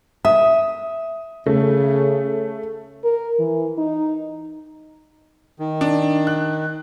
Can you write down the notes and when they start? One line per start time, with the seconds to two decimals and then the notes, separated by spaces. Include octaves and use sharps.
0.25 E5 D#6
1.46 C#3 A3
3.04 A#4
3.39 E3
3.78 D#4
5.59 D#3
5.81 D4
6.27 F#6